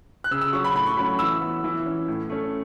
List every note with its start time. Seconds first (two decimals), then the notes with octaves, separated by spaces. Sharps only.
0.24 F#6
0.31 C#3 E6
0.41 E6
0.53 F#3 C#4 C#6
0.64 B5
0.75 A2 B5
0.86 C#6
0.97 F#3 A3 C#4 B5
1.19 E3 E6
1.41 B3
1.64 E3
1.86 C#4
2.08 A2
2.30 A3 C#4